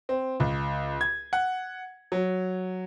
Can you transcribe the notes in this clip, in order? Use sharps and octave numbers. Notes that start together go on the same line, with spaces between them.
C4
C#2
G#6
F#5
F#3